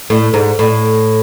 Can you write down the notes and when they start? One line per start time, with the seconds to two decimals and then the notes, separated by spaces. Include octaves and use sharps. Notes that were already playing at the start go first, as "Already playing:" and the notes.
0.10 A2
0.34 G#2
0.59 A2